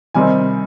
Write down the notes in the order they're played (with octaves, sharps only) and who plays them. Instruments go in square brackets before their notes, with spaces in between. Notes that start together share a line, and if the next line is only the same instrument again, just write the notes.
[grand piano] C3 D#3 G3 C4 D#4 G#5